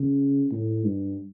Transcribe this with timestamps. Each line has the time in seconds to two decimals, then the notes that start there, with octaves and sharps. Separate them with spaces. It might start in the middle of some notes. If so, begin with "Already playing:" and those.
Already playing: C#3
0.52 A2
0.86 G2